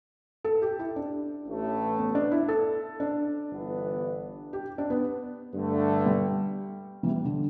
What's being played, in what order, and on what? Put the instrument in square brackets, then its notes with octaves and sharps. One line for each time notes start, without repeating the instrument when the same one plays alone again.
[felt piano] A4
G4
E4
D4
[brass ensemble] A1 A2 A3
[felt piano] B3
D4
E4
A4
D4
[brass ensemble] G1 G2 E3 B3
[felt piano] G4
D4
B3
[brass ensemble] G2 D3 A3
[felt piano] G3
E3
G3
D3